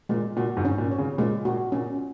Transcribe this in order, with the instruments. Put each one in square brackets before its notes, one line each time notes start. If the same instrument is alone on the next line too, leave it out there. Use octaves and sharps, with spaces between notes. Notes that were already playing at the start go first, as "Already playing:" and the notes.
[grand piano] A#2 [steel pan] G#3
[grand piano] A#2 [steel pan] F#4
[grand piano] G#2
[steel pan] C#4
[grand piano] A#2
[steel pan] C#5
[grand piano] C#3
[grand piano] A#2 [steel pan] G#3
[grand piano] A#2 [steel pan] F#4
[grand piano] A#2 [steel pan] C#4